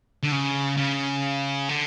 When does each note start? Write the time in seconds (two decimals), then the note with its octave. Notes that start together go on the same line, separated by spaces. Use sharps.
0.23 D3
0.32 C#3
0.77 C#3
1.69 D3